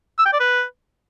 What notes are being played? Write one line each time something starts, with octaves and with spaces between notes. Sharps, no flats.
E6
G5
D5
B4